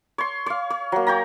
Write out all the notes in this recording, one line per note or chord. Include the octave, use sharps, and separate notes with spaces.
C#5 C6
C#5 F5
C#5
F#3 A#3
C#5 G5 A#5